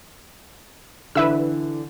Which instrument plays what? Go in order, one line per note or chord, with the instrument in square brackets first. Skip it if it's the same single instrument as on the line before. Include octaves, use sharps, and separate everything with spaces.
[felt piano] D3 E3 [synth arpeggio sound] B4 E5 E6